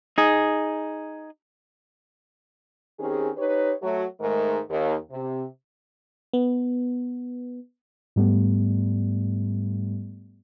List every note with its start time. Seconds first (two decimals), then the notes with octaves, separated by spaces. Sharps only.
0.18 D#4 G#4
3.00 D#3 C4 C#4 G4 G#4
3.37 D#4 G4 B4 C#5
3.82 F#3 A3 F#4
4.20 G#2 D#3 G#3 A3 A#4
4.69 D#2
5.10 C3
6.33 B3
8.16 G#2 G3 A3 B3